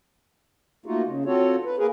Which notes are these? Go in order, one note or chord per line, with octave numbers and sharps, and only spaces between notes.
A3 A#3 D#4 F4 F#4
C#3
C4 F4 F#4 A4 C#5
B4
A#3 G#4 A#4 B4